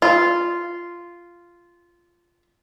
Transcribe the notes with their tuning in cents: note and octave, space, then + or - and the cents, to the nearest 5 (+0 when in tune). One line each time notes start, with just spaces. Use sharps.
F4 -10